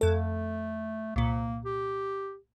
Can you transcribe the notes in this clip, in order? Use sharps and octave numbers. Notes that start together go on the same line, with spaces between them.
F2 A3 A4
C2 A#2 A#3
G4